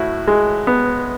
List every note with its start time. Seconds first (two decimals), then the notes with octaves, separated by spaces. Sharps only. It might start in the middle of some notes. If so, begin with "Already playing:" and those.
Already playing: A2 E4 F#4
0.27 G#3
0.67 B3